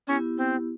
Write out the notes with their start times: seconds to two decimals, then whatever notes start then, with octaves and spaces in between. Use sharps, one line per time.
0.07 B3 C#4 E4 G4
0.38 C4